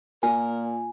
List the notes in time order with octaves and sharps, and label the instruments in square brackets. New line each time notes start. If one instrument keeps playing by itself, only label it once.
[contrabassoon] A#2 [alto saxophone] A#4 [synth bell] G#5